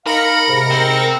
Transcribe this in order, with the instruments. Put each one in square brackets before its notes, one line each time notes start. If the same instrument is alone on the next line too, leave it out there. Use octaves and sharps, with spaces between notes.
[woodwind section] D#4 F5 [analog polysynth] A#4 A#6 C#7 [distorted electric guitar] B5
[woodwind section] G#2 C3
[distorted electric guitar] C4